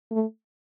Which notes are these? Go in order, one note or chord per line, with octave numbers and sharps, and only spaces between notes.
A3